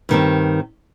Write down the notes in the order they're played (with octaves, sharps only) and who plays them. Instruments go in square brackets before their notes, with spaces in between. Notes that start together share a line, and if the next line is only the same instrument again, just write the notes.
[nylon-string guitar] G2 D#3 G3 C4